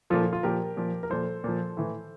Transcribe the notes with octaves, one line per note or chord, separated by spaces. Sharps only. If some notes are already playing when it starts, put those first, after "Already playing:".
A#2 F3 F4 A4
F4
F4
A#2 F3 G4 A#4
A#2 F3
A#4
A#2 F3 A4 C5
A#2 F3
A2 E3